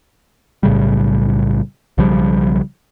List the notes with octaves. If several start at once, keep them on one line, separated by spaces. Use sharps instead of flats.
B1 A2 C#3 G3
B1 C#3 F3 G3